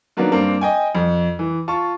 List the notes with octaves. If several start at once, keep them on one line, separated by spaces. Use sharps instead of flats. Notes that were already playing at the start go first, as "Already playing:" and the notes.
D#3 F#3 A#3 B3 D4
G2 A#3 C4 D4
D#5 G5 G#5
F2
E3
F4 A5 C#6